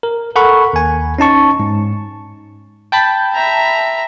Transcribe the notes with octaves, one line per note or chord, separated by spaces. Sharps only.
A#4
A4 A#4 F#5 B5 C#6
D#2 G#5
C#4 D#4 A5 C#6
G#2
G5 A5 B5
E5 A#5